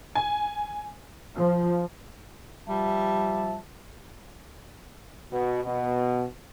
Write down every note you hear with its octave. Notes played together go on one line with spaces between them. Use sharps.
G#5
F3
F3 G3 E5 A5
B2
B2